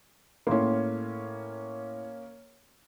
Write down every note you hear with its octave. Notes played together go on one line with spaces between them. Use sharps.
A2 A#3 C#4 C6